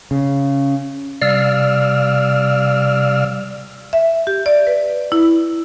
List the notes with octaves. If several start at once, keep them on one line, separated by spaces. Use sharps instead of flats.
C#3
C3 G3 D5 F5 E6 F6
E5
G4
D5
B4
E4